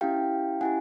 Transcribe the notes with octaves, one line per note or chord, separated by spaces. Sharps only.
C#4 E4 G4 F5 G5
C#4 E4 G4 F#5 G#5